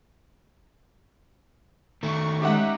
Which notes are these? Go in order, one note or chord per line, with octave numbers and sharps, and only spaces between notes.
D#3 A3 C#6
G#3 C#4 D#4 G4 E5 F#5